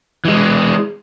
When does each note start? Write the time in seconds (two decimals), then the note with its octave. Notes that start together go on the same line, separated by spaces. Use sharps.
0.25 E3 G#3